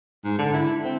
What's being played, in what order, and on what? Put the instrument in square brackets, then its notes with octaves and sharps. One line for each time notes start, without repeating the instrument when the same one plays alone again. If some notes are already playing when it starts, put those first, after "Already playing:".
[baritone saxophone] G#2
D3
E4
C4